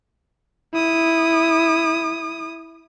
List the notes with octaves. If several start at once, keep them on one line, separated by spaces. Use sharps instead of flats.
E4 D#6